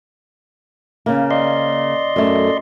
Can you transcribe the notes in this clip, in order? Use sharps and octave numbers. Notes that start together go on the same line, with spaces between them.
C#3 A#3
D5 D#5 C6
F#2 A3